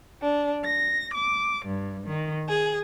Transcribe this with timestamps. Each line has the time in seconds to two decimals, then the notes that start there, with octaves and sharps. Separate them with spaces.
0.22 D4
0.64 A#6
1.14 D6
1.66 G2
2.07 D#3
2.47 G#4